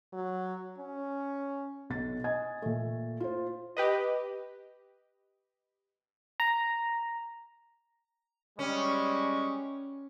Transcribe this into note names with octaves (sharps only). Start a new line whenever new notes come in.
F#3
C#4
B1 A6
D#5 G#5 G#6
A#2 A3
F4 C5
G4 B4 D#5
A#5
G3 G#3 C#4 C#6